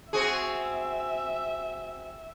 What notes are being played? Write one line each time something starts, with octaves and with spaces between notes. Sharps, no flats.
C4 F#4 G#4 E5